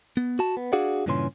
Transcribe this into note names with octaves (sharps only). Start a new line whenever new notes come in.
B3
F#4 A5
B3
D4 F#4 G#4 D5 F5 F#5
G2 A#2 C#3 E3 C#4 C6